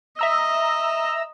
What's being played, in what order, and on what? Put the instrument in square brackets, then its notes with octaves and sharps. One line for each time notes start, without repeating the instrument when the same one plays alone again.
[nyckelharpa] D#5 [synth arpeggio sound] E5 A#5 E6